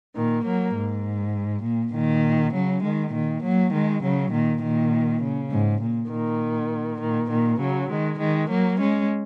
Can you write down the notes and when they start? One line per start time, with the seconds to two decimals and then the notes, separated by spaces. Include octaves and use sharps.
0.14 A#2 D#3
0.44 F#3 A#3
0.74 G#2
1.63 A#2
1.93 A#2 D#3
2.52 C#3 F#3
2.82 D#3 G#3
3.12 A#2 D#3
3.42 F#3 A#3
3.72 D#3 G#3
4.02 C#3 F#3
4.32 A#2 D#3
4.61 A#2 D#3
5.21 C#3
5.51 G#2
5.81 A#2
6.10 A#2 D#3
7.00 A#2 D#3
7.29 A#2 D#3
7.60 C#3 F#3
7.89 D#3 G#3
8.19 D#3 G#3
8.49 F#3 A#3
8.79 G#3 C#4